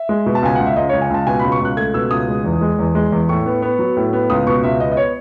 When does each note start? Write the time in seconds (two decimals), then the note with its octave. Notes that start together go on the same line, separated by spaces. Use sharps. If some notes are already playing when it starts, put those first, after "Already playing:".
Already playing: E5
0.09 G#3
0.26 B2
0.35 A5
0.43 C#2 G#5
0.55 C#2 F#5
0.66 E5
0.76 C#2 D#5
0.89 C#5
0.93 C#2
1.02 G#5
1.10 C#2 A5
1.27 B2 G#5
1.39 B5
1.44 C#2
1.52 C#6
1.60 C#2 F#6
1.77 A3 G#6
1.94 B2 E6
2.11 C#2 D#6
2.28 G#3
2.44 E2
2.61 G#3
2.79 E2
2.95 G#3
3.12 E2
3.29 A2 C#6
3.46 B3
3.62 B3
3.79 F#3
3.96 A2
4.13 B3
4.30 C#2 D#6
4.47 B2 C#6
4.63 C#2 E5
4.80 B3 D#5
4.92 D#5
4.97 C#5